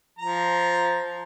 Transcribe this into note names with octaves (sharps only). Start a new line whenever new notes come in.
F3 A#5